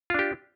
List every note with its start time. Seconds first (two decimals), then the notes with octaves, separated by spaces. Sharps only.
0.10 F4
0.14 D4
0.19 G4